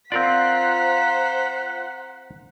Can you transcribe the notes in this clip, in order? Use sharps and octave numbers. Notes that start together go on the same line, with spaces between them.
C4 F4 A#4 C5 D5 F#5 A#5 B6